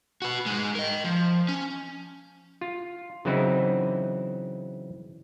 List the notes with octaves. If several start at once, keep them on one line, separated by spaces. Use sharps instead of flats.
F#4 B4
G#3 D#4
A#4 D#5
F3
C#4
F4
C#3 E3 F#3 C4 D#4 E4